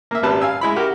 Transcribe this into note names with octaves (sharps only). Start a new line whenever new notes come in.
A#3 E5
G#1 G3 B4 A5
F5 G#5 E6
G#3 E4 B5
F#4 G4 A#4